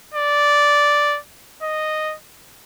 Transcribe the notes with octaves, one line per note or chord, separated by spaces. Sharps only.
D5
D#5